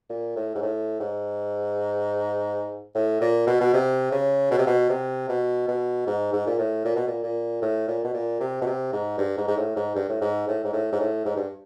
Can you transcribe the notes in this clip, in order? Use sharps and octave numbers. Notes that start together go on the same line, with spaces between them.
A#2
A2
G#2
A2
G#2
A2
A#2
B2
B2
C3
C#3
B2
C3
B2
C3
B2
B2
G#2
G#2
A#2
A2
A#2
B2
A#2
A#2
A2
A#2
B2
A#2
C3
B2
C3
G#2
G2
G#2
G#2
A2
G#2
G2
A2
G#2
A2
G#2
A2
G#2
A2
G#2
G2